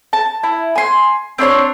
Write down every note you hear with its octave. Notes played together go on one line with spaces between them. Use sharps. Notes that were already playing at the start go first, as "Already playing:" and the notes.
A5
E4
G#5 C6
C4 D4 C#5 C6